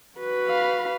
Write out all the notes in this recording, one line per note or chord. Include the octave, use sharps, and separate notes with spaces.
F#4 B4
F5 B5